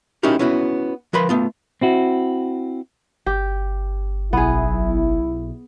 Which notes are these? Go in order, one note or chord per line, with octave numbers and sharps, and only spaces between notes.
C#4 D#4 E4 F#4 G4 A#4
B3 C#4 E4 F#4
F3 A#4 B4 B5 C6
A3 B3 F4
C4 E4 F#4
G1 G4
B1 B3 E4 G#4